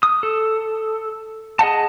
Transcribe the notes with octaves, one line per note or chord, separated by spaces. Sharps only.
D#6
A4
G#4 D#5 F#5 A5